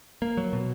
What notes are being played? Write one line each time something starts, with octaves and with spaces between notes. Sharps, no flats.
A#3
F#3
B2